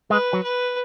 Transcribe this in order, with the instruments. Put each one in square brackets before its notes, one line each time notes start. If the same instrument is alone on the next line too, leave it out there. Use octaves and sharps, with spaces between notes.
[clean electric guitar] G#3 [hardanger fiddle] B4
[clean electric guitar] F#3
[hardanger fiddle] B4